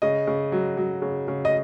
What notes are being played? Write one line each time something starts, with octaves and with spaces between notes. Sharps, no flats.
C#3 D#5
C#3
F#3
F#3
C#3
C#3
D#5